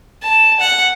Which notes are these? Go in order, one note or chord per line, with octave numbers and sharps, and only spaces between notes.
A5
F#5